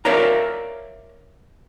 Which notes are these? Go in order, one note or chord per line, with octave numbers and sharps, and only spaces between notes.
A#4 C#5 D5 E5 F5 A#5